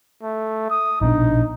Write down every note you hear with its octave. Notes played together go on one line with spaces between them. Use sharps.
A3
D#6
A#1 B2 D4 D#4